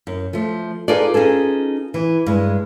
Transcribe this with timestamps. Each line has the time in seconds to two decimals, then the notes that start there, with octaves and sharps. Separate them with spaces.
0.07 F#2
0.33 F3 A3
0.88 D#4 F4 G#4 A4 B4 D5
1.14 C#4 D#4 F4 G#4 A4
1.94 E3
2.27 G2 G#3